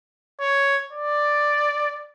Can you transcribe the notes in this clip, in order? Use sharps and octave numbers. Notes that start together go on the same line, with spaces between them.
C#5
D5